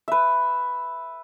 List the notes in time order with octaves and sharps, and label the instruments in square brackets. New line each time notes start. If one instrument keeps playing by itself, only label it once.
[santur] B4 E5